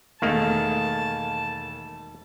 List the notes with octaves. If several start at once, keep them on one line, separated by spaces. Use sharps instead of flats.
E1 D#3 A3 A#3 A5